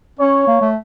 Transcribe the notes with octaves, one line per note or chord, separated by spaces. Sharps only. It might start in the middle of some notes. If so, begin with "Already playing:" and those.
C#4 C#5
A#3
A3